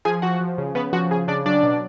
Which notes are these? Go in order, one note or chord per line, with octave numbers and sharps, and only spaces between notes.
F3 G#4 G#5
F3 F#4 F#5
F3
C#3
C#3 B3 B4
F3 F#4
C#3 G#4
C#3 D4 D5
F#3 D4 D5
B2